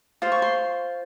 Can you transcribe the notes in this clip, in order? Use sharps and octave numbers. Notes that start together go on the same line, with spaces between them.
F4 C5
C#6
C6